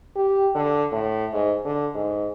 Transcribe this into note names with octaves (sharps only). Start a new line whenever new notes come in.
G4
D3
A2
G#2
D3
G#2